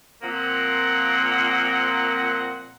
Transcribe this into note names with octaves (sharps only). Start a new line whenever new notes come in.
A#2 F3 A#3 C4 F#5